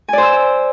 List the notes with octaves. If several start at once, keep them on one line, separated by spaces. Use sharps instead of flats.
C5 D5 G#5 E6